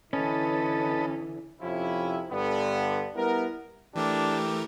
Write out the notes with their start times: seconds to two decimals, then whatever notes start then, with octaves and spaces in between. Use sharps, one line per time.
0.13 D3 E3 C#4 A4 B4 D#5
1.61 F2 C3 F3 C#4 E4
2.31 G2 D3 B3
3.16 G3 B3 E4 A#4
3.95 E3 A3 D4 G4 A#4